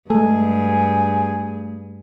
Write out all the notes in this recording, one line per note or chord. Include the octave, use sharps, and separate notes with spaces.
G2 G#3 A3 G#4 A4